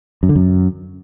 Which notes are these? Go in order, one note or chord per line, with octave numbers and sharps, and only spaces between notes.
F#2
D3
F#2